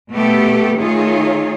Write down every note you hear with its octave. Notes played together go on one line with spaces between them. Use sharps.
B2 A3 B3 G4 A4
D#3 A3 D#4 F4 G#4 C#5